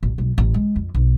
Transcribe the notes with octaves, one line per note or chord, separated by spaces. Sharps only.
A1
B1
A1
G#3
F2
B1